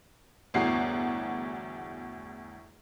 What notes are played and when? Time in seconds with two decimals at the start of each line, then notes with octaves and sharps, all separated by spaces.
0.54 G1 E2 A2 F#4 C7